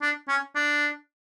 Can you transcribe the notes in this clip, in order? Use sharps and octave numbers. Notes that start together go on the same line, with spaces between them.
D4
C#4
D4